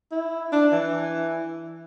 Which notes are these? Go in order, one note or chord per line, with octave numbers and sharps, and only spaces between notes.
E4
D4
E3